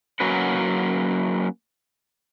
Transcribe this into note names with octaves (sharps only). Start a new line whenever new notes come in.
F#3 A#3 C#4 D#4 F#4 B4